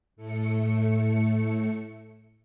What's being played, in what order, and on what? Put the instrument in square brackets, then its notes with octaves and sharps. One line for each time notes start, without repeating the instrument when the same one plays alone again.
[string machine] A2 A3 C#7